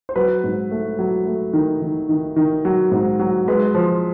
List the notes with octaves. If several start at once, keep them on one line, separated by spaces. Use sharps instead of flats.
C5
F#3 B4
G#2
A3
F#3
A3
D#3
D#3
D#3
D#3
F#3
G#2
F#3
G#3 B4
F3